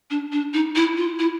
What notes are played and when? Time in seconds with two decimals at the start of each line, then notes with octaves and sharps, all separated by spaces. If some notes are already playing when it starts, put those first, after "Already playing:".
0.10 D4
0.32 D4
0.54 D#4
0.76 E4
0.97 F4
1.19 E4